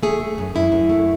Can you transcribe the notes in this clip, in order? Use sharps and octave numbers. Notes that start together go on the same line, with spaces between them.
A3 G#4
A3
F#2
F#2 E4
F#2
A3